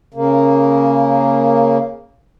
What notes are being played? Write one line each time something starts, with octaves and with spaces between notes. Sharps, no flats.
C#3 A#3